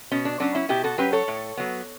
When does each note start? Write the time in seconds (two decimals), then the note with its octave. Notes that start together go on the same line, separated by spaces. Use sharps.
0.12 B2 C#4
0.25 D4
0.40 F#3 C#4 D4
0.55 C#4 E4
0.69 B2 E4 G4
0.84 F#4 A4
0.98 F#3 C#4 G4 B4
1.13 A4 C#5
1.28 A2
1.57 F#3 B3